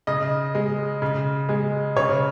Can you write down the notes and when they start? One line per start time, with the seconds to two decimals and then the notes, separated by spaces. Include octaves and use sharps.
0.07 C#3 D#5
0.55 G#3
1.02 C#3
1.49 G#3
1.96 C#3 C#5